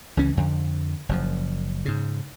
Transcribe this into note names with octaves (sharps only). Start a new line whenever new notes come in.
C#2 C#3 E3 C#4
F2 D3
F#1 F#2 F3
G#2 C#3